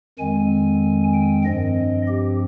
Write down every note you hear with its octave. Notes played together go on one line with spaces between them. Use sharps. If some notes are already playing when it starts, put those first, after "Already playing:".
F2 D#3 G#3 C4 G#5
G5
G2 F3 C4 D#5
G4